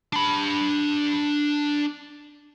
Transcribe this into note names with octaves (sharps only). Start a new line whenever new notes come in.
D4 B5